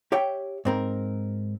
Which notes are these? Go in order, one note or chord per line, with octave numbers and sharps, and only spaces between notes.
G4 C#5 E5 G5
G#2 C4 A#4